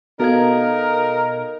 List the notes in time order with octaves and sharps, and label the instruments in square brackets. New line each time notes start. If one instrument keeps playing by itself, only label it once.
[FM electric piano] B2 [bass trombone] D#4 [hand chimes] A4 F5 G#6 [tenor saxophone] A#4